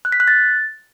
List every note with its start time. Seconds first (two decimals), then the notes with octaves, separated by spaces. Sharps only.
0.05 F#6
0.12 B6
0.20 F#6
0.28 A6